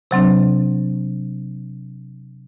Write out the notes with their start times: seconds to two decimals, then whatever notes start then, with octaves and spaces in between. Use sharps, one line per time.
0.11 C3 F#3 C4 D4